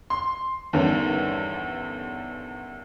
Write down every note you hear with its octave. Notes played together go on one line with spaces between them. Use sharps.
C6
E2 G2 D3 D#3 C#4